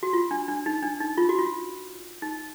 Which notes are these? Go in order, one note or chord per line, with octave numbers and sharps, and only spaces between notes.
F#4
F4
D4
D4
D#4
D4
D#4
F4
F#4
F4
D#4